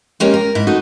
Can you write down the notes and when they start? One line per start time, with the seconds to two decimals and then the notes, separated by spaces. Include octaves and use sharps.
0.20 G#3 A#3 C#4 G4 A#4
0.34 A#4
0.55 G#2 E4
0.67 A3 D#4 F#4